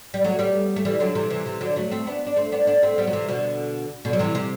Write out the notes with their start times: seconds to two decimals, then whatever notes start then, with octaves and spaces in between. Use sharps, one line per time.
0.14 G3
0.24 F#3 A3
0.39 G3 B3
0.76 A3
0.85 E3 G3
1.00 D3 F#3
1.15 C3 E3
1.30 C3 E3
1.46 C3 E3
1.61 D3 F#3
1.76 F#3 A3
1.91 A3 C4
2.07 B3 D4
2.27 D4
2.36 A3 C4
2.52 B3 D4
2.67 B3 D4
2.83 A3 C4
2.98 G3 B3
3.07 F#3
3.13 C3 E3
3.28 B2 D3
4.05 B2 D3
4.13 F#3
4.19 C3 E3
4.35 C3